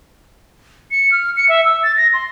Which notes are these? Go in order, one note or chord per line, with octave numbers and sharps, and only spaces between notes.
C#7
F6
C#7
E5
E6
A6
A#6
C6